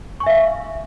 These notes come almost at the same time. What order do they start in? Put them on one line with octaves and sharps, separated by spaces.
C#6 G#5 E5 F5